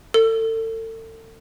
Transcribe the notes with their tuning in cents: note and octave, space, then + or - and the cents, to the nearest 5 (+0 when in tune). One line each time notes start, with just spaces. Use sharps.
A4 +35